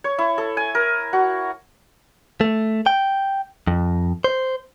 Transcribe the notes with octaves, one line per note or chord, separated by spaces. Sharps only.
C#5
E4
A4
G#5
A#4
F#4
A3
G5
F2
C5